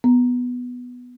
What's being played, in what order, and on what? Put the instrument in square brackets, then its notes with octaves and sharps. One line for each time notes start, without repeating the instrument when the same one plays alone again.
[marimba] B3